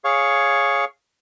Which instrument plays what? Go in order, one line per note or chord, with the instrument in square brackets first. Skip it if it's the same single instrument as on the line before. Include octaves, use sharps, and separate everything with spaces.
[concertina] G#4 C#5 F5 C#6